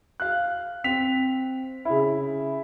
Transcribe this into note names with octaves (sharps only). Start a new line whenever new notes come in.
F5 F#6
C4 B6 F7
C#3 E4